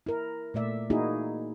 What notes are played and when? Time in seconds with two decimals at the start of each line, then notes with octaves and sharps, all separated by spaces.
0.06 E4 A#4
0.54 A#2 A3 D5 E5
0.90 A#3 D#4 E4 F#4 G#4